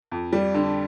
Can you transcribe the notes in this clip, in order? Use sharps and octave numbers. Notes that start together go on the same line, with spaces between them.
F2
G3
D3